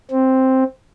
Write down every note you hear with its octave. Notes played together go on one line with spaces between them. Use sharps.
C4